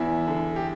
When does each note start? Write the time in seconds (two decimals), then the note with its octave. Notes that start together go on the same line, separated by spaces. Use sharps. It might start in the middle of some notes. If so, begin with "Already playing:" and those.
Already playing: E2 E4
0.27 D3
0.56 G4